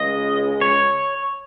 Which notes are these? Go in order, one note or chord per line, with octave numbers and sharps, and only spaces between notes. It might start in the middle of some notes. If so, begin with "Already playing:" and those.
Already playing: C#2 C#3 G#3 D#5
C#5